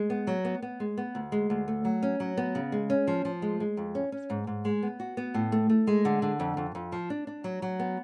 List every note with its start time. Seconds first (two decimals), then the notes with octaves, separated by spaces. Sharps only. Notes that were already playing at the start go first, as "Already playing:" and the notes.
Already playing: G#3
0.10 B3
0.27 F#3
0.45 B3
0.62 B3
0.80 G#3
0.97 B3
1.15 D2
1.32 G#3
1.50 D2
1.68 A3
1.85 F#3
2.02 C#4
2.20 F#3
2.37 B3
2.55 C#3
2.72 G#3
2.90 C#4
3.07 F3
3.25 F3
3.42 G#3
3.60 G#3
3.77 F2
3.95 C#4
4.12 C#4
4.30 G#2
4.47 G#2
4.65 G#3
4.83 B3
5.00 F#4
5.17 B3
5.34 A2
5.52 A3
5.70 A3
5.87 G#3
6.05 D3
6.22 D3
6.40 F2
6.57 F2
6.75 F2
6.92 F3
7.10 D4
7.27 D4
7.44 F#3
7.62 F#3
7.80 B3